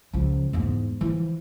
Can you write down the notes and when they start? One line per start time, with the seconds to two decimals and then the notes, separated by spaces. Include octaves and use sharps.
0.13 C#2 F3
0.53 E2 G#2
1.01 E3 F3